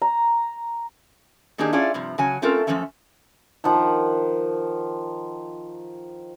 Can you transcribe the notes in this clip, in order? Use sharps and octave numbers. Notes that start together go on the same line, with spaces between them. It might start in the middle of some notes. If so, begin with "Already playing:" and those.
A#5
D#3 A#3 D4 D#4 G4 G#4
C#4 E4 F4 G#4 D5
G2 C3 F3
C#3 F#3 G#5
A3 C4 C#4 F4 A4 A#4
F#2 A#2 F3 A3 C#4 E5
D#3 F3 F#5 A#5